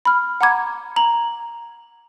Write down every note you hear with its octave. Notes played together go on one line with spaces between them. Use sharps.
B5 F6
F#5 A#5 B5 D6 G#6
A#5 F#7